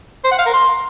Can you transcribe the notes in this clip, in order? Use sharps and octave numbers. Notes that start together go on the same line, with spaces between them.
C5
F#5
F5
A#4
C6